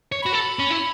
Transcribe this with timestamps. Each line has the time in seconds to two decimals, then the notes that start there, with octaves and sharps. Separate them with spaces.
0.12 C#5
0.22 F#4 B5
0.33 A4
0.59 C#4
0.70 E4